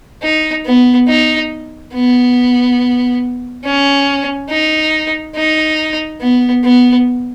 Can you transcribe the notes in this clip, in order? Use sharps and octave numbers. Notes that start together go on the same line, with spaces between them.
D#4
B3
D#4
B3
C#4
D#4
D#4
B3
B3